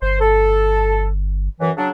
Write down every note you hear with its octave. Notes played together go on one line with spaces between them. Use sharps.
G1 C5
A4
F#2 E3
C#3 F#3 D4